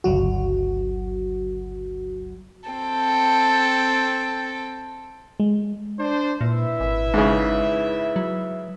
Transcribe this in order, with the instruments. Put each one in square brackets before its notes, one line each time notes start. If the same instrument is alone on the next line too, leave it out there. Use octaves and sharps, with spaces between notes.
[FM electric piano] G1 C#2 F#3 F#4
[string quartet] C4 A4 G5
[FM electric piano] G#3
[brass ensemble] D4 C5
[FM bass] A#2 [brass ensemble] E4 B4 E5
[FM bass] G#1
[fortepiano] G#2 C#3
[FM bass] F#3